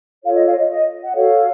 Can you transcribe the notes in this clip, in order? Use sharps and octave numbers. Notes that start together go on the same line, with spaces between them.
F4 A4 C#5 F5
D#5
F5
D#5
D#5
F#5
F#4 A4 C#5 F5